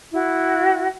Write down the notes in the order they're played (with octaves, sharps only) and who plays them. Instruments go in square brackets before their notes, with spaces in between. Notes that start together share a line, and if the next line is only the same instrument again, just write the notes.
[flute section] E4 F#4